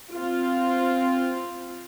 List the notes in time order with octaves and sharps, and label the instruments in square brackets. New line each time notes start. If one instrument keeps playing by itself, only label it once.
[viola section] C4 F4